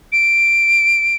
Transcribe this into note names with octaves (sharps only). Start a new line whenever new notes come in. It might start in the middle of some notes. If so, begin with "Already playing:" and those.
D7